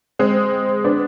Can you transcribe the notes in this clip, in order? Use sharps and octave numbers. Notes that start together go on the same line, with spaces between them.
G#3 C4
B3 D4